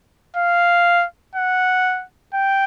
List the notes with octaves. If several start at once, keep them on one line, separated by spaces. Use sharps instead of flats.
F5
F#5
G5